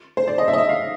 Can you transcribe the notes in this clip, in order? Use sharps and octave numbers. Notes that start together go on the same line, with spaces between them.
C5
D5
D#5
E5
D#5
E5
F5